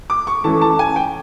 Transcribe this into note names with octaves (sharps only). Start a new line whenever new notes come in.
D6
C#6
E3 A3 C#4 E4 A5
A5
G#5
G5